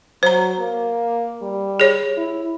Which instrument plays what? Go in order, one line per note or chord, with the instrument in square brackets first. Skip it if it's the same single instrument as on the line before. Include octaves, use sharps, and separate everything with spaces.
[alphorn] F#3 [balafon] C5 A#5
[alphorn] A#3
G3
[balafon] G#4 C#5
[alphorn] E4